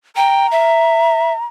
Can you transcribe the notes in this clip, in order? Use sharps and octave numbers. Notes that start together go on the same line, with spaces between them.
G5 A#5
E5